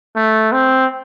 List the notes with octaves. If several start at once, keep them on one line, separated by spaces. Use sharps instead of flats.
A3
C4